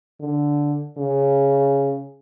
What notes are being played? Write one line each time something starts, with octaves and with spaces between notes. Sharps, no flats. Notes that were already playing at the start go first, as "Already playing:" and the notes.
D3
C#3